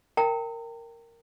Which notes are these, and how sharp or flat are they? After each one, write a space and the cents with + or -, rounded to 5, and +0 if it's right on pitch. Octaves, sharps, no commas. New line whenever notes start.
A#4 -10 G5 +0 A#5 -40